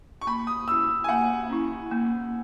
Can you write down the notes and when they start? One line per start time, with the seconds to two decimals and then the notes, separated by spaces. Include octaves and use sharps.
0.21 C#6
0.27 A#3 B5
0.47 D#6
0.68 C#4 E4 E6
1.04 G#5
1.09 A#3 F#5
1.50 C#4 E4
1.91 A#3